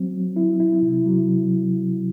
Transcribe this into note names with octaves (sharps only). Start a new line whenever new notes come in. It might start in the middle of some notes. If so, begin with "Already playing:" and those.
Already playing: F#3 C4
F#3
E4
E4
C3
F#3